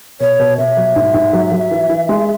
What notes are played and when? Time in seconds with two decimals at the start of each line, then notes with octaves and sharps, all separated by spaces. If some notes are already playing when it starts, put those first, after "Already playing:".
0.20 B2 C#5
0.39 B2
0.58 B2 E5
0.77 F#3
0.96 G#2
1.14 G#2
1.33 F#3
1.52 F#3
1.71 E3
1.90 E3
2.09 G#3